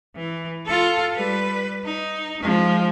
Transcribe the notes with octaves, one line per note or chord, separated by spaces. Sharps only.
E3
F4 A4
G3 B4
D#4
F3 G#3